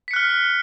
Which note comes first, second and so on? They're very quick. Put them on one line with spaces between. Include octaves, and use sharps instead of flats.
B6 C#7 F#6 F6